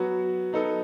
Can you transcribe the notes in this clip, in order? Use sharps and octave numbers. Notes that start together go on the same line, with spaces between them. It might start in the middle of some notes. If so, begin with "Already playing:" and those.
Already playing: F#3 B3 F#4
F#3 B3 D#4 A4